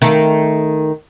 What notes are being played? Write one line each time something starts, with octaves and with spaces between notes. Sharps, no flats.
D#3 A3